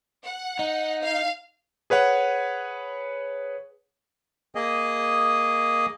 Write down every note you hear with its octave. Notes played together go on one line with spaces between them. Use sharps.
F#5
D#4
F5
G#4 B4 C#5 F#5
A#3 G#4 D#5